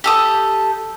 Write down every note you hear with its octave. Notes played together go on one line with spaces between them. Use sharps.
G4 A4 D#6